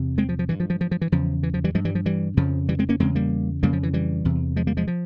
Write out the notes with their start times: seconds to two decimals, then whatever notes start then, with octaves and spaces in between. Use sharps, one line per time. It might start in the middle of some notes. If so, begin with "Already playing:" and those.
Already playing: E2 C3
0.18 G#3 C4
0.29 F3
0.39 F3
0.49 G2 E3
0.60 F3
0.70 F3
0.81 F3
0.91 F3
1.02 E3
1.12 E2 C#3 F3
1.43 E3
1.54 F3
1.64 E3 G3
1.75 G2 F3 G#3
1.85 E3 G3
1.95 F3
2.06 E3 G3
2.37 F2 C#3 F3
2.69 E3 G3
2.79 G#3 C4
2.89 A#3 C#4
3.00 E2 C#3 G#3 C4
3.15 G3 A#3
3.63 F2 C#3 G3 A#3
3.73 F3
3.83 E3
3.94 E3 G3
4.25 E2 C3
4.56 F3 G#3
4.67 G3 A#3
4.77 F3 G#3
4.87 F3